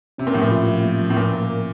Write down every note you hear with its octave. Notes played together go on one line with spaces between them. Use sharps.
C3 C#4
A#2
A2 F3
A#2
F4
F3
A#3
F3
A2
A#2 A#3
A#3
A#3